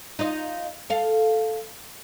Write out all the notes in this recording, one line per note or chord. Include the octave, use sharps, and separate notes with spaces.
D#4 F4 D#5
A4 F5